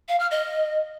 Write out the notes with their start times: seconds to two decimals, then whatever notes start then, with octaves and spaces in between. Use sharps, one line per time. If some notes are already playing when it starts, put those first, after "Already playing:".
0.09 F5
0.20 F6
0.31 D#5